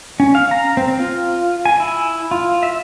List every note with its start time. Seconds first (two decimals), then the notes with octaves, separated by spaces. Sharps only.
0.20 C#4
0.35 F5
0.51 A#5
0.77 C4
0.99 F4
1.65 G#5
1.80 E4
2.31 F4
2.63 E5